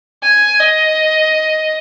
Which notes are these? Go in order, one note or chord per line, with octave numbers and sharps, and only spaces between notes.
G#5
D#5